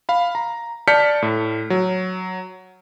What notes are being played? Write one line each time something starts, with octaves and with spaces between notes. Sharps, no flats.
F5 B5
A#5
D5 A5 F6 G6 B6 C#7
A2
F#3